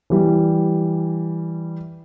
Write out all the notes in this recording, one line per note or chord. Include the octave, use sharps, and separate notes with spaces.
E3 G3